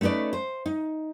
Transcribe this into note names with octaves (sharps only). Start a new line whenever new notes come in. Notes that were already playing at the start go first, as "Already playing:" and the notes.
A3 C#4 D#4 B4 D5
C5
D#4